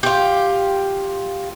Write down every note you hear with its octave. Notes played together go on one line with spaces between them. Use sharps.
F4 G4